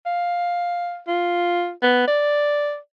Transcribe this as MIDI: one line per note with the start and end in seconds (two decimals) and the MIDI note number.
0.06 0.99 77
1.08 1.71 65
1.83 2.04 59
2.08 2.77 74